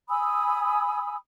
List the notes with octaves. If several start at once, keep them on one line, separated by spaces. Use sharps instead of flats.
G#5 B5 D#6 E6